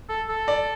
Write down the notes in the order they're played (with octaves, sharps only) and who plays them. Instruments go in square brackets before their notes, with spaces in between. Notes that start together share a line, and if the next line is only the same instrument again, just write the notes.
[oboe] A4
A4
[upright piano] D5